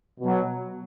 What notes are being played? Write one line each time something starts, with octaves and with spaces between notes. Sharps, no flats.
B2 F#3